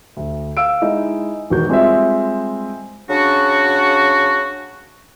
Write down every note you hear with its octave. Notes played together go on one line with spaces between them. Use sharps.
D2
F5 E6 D7
G#3 D#4 E4
E1 D#3 F#4 G6
G3 G#3 C4 F4 D#5 E5
C#3 D4 F#4